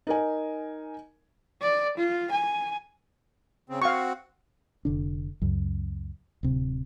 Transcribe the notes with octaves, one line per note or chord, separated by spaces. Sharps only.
D#4 A#4 G#5
D5
F4
G#5
C#3 C4
C4 F#4 F5 C#6
F1 D3 D4
C#2 F#2
D1 C3